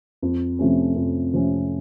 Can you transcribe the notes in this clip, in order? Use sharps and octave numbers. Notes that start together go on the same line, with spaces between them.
F2
C3 F3 A3 C#4
F2
C3 F3 A3 C#4